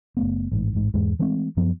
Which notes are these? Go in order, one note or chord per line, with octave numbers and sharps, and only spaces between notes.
F#1 A3 B3
A1 G#2
A1 G#2
E2 G#2 G#3
E3 G#3 A3 C4
F#2 F3 B3